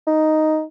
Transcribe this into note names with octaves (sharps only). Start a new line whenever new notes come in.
D#4